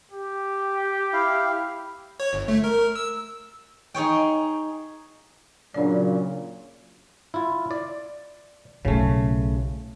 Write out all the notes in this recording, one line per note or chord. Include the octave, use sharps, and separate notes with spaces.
G4
E4 F5
C#5
G1
A3
A#4
E6
D#4 G#4 C#5 G5
A#2 C#3 F#3 D4 D5
E4 F4
D5
B1 A2 C#3 A3